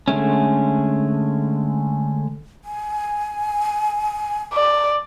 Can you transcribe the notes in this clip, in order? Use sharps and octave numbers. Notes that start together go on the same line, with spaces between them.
D3 G#3 A3 C#4
G#5
D5